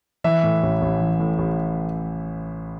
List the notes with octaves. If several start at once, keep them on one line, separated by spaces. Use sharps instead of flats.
E3 E5
A2
A1
A1
E3
A2
A1